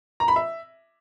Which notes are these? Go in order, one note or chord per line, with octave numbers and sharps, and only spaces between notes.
A#5
B5
E5